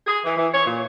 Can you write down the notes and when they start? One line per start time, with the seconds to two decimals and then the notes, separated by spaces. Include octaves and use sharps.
0.07 G#4
0.24 E3
0.37 E3
0.53 C#5
0.66 A#2